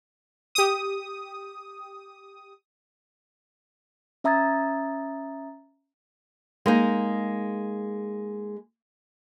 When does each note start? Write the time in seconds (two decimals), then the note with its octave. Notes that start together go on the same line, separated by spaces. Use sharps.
0.55 G4 D#6
4.24 C#4 E5 A#5 D#6 G#6 A6
6.66 G#3 A#3 D#4